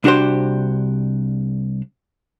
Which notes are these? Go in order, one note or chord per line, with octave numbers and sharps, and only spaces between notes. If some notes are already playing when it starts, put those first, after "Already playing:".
C2 D4 F#4 G4 C5